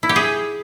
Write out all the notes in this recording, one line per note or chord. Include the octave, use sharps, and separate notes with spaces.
E4
G4
G#4